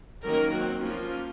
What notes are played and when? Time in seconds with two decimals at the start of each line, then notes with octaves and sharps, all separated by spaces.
0.25 D#3 F#3 A#3 C#4 A#4
0.54 F#3 C4 F#4
0.83 F3 A#3 C#4 F4